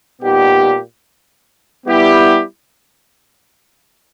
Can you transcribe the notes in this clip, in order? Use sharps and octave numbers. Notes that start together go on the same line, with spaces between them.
A#2 G3 B3 D#4 G4
G3 B3 E4 G4